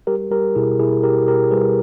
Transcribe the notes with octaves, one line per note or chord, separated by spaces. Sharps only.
G3 G4 A#4
G3 G4 A#4
B2 E4 G#4
B2 E4 G#4
B2 G4 A#4
B2 G4 A#4
G3 G#4 B4